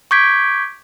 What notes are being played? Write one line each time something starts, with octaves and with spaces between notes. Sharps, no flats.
C#6 D6 G6 G#6 B6 D7